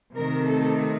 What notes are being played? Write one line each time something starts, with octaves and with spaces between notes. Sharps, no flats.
C3 D#3 A3 C4 A#4
A4